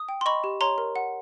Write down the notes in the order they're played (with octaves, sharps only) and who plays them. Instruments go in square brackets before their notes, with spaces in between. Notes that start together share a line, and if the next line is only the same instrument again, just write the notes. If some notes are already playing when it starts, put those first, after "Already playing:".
Already playing: [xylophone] D#6
G5
C6
D#5 B5 C#6
G4
C#5 A#5 C6
A#4
F#5